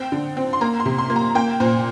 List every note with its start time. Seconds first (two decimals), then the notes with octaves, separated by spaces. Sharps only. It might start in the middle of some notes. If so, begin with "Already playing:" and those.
Already playing: C4 G5
0.12 D3
0.37 C4
0.53 C6
0.61 A#3 A#5
0.80 C6
0.86 C3
0.98 C6
1.10 A#3
1.16 A#5
1.35 A#3 G5
1.60 A#2 C5